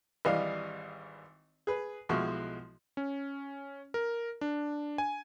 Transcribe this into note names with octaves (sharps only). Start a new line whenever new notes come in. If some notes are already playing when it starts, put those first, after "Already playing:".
G#1 E3 G3 D#5 F5 D#6
G#4 B4
B1 F3 G#3 E4 F#4 C#6
C#4
A#4
D4
G#5